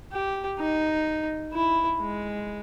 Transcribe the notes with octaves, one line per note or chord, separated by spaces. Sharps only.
G4
D#4
E4
G#3